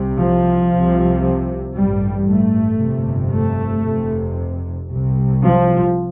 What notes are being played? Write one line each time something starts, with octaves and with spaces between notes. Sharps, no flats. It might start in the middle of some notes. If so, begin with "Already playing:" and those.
Already playing: C2 C3
F3
C2 C3
A1 G2 G3
A3
G1 F2 C3
A3
F1 F2 C3
C2 C3
F3